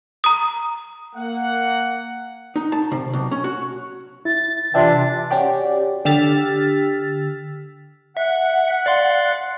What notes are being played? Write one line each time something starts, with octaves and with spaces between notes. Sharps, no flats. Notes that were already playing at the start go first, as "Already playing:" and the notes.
A#5 D#6
A#3 F#5
D#4
A5
C3
B1
C#4
F#4
E4 A6
C3 E3 D4 F4 D5 E5 G5
C#4 F#4 G4 D5
D3 G4 E6 F6 A6 B6
E5 F#5
D5 F5 C6